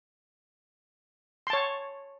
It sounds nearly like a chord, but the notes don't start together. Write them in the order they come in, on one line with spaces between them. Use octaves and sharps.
C6 A5 C#5